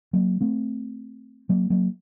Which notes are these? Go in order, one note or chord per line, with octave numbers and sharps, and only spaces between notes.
F#3 A#3
A3 C4
F#3 A#3
F#3 A#3